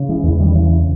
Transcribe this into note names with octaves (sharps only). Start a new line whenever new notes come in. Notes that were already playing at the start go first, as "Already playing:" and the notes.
Already playing: C#3
E3 G#3
E2 E3 G#3
D#3 G3
C#3 E3